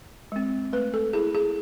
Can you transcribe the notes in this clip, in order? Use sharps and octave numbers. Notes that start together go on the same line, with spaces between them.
G#3 C4
A3 B4
A4
E4 G#4
G#4